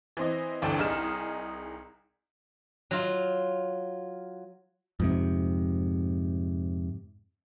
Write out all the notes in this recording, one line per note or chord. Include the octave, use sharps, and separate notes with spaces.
E3 C4 D#5
G1 D2 E3 D4 A4 G5
C2 D#4 G#4 F6 E7
F#3 F4
F2 G#2 C3